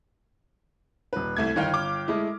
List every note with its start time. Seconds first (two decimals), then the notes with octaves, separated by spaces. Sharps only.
1.13 D#1 B4
1.37 C2 A3 G#6
1.56 G1 D#3 D#4 F5 G5 F6
1.74 D6
2.08 G#3 A3 E4